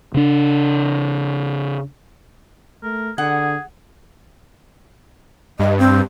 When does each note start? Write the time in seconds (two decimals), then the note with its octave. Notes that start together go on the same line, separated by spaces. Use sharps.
0.14 C#3 D4
2.83 A3 A#4
3.18 D3 G#4 F#5
5.59 G2 D#5
5.79 C4